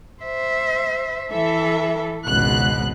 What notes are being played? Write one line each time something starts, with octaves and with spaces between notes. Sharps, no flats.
C5 E5
E3 A4 E5
G#1 C#2 B2 F#6